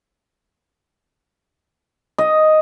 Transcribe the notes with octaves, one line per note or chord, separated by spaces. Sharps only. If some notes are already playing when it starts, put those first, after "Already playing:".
D#5